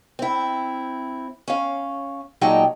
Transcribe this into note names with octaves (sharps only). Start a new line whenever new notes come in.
C4 E4
C#4 F5
A#2 F#3 G#3 D#4 G5 A5